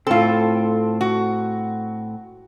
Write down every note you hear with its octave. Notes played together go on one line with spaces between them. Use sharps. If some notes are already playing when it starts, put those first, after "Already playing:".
A2 C4 F4 A4
F#4